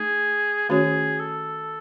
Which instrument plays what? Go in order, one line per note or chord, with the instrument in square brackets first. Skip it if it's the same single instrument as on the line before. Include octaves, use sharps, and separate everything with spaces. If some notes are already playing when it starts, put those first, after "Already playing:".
Already playing: [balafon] A3 D#4 [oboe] G#4
[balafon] D#3 A3 C#4 F#4 C#5 [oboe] G#4
[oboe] A4